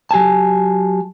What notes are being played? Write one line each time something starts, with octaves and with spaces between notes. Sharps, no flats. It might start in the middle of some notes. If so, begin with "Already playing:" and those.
F#3 G4 G#5 A5